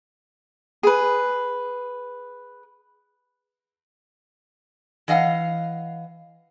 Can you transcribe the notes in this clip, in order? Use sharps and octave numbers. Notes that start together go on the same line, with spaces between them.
G#4 B4
E3 D#5 F5 F#5